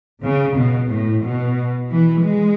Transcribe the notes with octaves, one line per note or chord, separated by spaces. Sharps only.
C#3
B2
A2
B2
E3
G#3